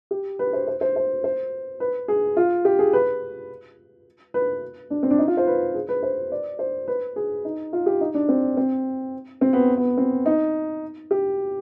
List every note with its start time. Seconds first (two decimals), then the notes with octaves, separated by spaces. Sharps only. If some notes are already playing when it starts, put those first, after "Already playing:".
0.11 G4
0.39 B4
0.53 C5
0.67 C5
0.81 C5
0.96 C5
1.24 C5
1.80 B4
2.08 G#4
2.37 F4
2.65 G4
2.79 G#4
2.93 B4
4.34 B4
4.90 D4
5.03 C4
5.11 D4
5.19 D#4
5.28 F4
5.37 C5
5.47 B4
5.75 G#4
5.89 B4
6.03 C5
6.32 D5
6.59 C5
6.88 B4
7.16 G#4
7.45 D#4
7.73 F4
7.86 G4
8.01 D#4
8.14 D4
8.29 C4
8.57 C4
9.41 C4
9.53 B3
9.77 B3
9.97 C4
10.26 D#4
11.11 G4